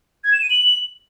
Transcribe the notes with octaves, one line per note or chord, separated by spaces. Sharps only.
G#6
E7
D#7
F#7